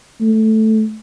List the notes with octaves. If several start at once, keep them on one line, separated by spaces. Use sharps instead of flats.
A3